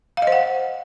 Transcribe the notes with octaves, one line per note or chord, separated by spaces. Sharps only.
F5
D#5
C5
F#5